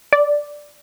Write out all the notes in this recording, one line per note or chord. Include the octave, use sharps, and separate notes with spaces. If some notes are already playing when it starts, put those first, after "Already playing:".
D5